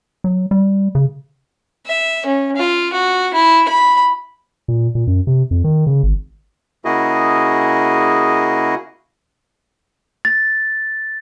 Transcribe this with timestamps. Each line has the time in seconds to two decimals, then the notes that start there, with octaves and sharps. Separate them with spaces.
0.24 F#3
0.51 G3
0.95 C#3
1.87 E5
2.26 C#4
2.56 F4
2.93 F#4
3.34 E4
3.69 B5
4.68 A#2
4.95 A#2
5.07 F#2
5.27 C3
5.51 F2
5.64 D#3
5.87 C#3
6.03 G#1
6.85 C#3 A#3 E4 F#4 G#4 D#5
10.25 A6